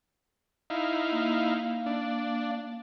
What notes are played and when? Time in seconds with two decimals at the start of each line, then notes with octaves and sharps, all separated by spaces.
0.70 D#4 E4 F5
1.11 A#3
1.86 D4